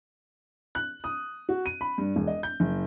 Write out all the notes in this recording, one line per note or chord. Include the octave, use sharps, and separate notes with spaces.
F#6
D#6
F#4
D#7
B5
G2
E1
D#5
G6
F#1